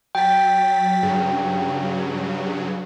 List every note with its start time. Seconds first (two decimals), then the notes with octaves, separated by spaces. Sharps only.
0.15 F#3 G5 A6 B6
1.03 G2 C#3 F#3